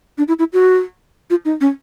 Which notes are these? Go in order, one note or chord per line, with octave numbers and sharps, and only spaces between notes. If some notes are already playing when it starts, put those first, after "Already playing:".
D4
E4
E4
F#4
F4
D#4
C#4